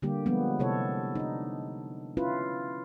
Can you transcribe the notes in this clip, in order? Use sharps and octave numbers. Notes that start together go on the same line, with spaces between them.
D3 G3 A#3 G4
F3 G3 G#3 A#3 B3
C3 E4 A4 C#5
D4 D#4
C#4 E4 F4 B4